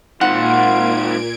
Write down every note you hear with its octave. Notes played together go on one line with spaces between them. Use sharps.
A#2 D#3 G#3 F4 F#5 G#6 D7